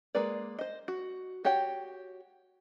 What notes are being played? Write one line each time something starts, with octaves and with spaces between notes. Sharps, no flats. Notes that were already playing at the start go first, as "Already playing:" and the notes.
G#3 A#3 G#4 B4 D5
C5 D#5
F#4
F#4 G4 C#5 F#5 G5